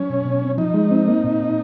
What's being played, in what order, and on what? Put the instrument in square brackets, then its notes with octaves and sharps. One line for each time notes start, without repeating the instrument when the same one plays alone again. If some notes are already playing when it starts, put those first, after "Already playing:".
Already playing: [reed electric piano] F#3 [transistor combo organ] C#4
[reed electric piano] B2
B2
C4
[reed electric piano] F3 [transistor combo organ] D#4
[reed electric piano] G#3
C4
A#3
A#2
A#2